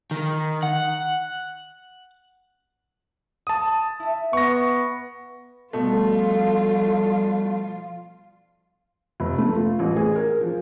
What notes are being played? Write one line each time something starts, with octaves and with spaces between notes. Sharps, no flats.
D#3
F#5
A5 D#6
E4 E5
B3 C#6 A#6
B2 F3 G3 A3 F4 A4
F1
A3
F4
A1
G#4
A#4
F3